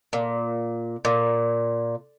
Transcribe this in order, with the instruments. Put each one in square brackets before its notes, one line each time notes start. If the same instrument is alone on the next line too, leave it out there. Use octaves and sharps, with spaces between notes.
[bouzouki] A#2
A#2